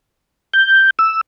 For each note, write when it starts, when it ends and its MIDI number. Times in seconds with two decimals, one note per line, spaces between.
0.54 0.90 91
0.99 1.21 88